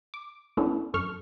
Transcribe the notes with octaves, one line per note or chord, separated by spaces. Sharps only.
D6
A3 B3 C#4 D4 E4
F#2 A4 C#6 F6